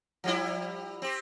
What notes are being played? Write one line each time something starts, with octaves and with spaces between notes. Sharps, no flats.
F3 G3 E4
C4 G4